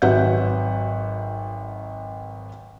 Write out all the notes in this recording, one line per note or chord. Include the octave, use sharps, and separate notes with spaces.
G#1 F#3 B4 E5 F#5 G6